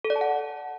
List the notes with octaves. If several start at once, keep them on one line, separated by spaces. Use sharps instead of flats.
A4
D5
A5
F#5